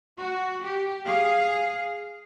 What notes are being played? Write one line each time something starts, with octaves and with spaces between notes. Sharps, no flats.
F#4
G4
G#4 F5